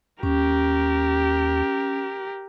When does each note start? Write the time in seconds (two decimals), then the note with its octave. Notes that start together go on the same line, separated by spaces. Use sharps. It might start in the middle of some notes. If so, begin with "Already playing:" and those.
0.23 D#2 C#4 G4 A#4